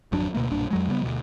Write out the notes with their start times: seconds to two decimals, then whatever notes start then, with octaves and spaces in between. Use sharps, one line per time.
0.12 G#1 F2 F#3 D4
0.34 D2 B2 A3 A#3
0.51 B1 G2 A#2 D4
0.71 F2 F#3 G#3
0.88 C#3 G3 A3 B3
1.01 D2 B2 F#3